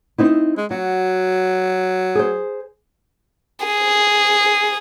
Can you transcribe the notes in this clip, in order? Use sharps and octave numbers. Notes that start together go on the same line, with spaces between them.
C4 D#4 E4
G#3
F#3 F#4
G#4 C5
G#4